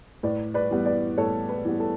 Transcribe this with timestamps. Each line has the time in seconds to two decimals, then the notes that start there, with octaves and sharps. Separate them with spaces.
0.23 A2 B4 D5
0.54 B4 D5
0.70 E3 G3 B3
0.86 B4 D5
1.17 A2 A4 C#5
1.49 B4
1.65 E3 G3 B3
1.80 A4